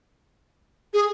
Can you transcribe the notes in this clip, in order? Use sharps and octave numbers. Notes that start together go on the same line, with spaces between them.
G#4